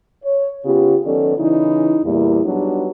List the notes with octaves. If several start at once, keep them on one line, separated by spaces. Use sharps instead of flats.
C#5
C#3 B3 F4 G4
D#3 F#3 B3 C#4 A4 D5
C#3 E3 D#4 E4
E2 A#2 G3 A#3 E4
F#3 G3 B3 D4 D#4 G#4